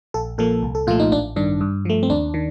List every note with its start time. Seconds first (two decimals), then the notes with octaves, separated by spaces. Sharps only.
0.14 A#1 A4
0.38 A#2 F3 A#3 A4
0.63 C2
0.75 A4
0.87 A#2 F3 A3 F4
1.00 D#4
1.11 A1 D4
1.36 G2 D#3 D4
1.61 G2
1.85 F3 A3
2.03 C4
2.10 D#2 D4
2.34 D#3